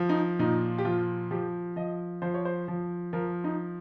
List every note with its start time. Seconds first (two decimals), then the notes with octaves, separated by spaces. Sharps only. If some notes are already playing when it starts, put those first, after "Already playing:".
Already playing: F3
0.09 D#4
0.39 A#2 D#4
0.78 G4
0.85 F3 F4
1.31 F3 G4
1.76 F3 D#5
2.22 F3 C5
2.34 C#5
2.45 C5
2.68 F3
3.13 F3 A#4
3.44 D#4